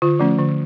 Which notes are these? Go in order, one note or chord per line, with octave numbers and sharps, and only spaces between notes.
D3 F4
F3 A3 C#4
D3